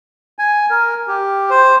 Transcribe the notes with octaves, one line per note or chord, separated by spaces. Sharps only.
G#5
A#4
G4
C5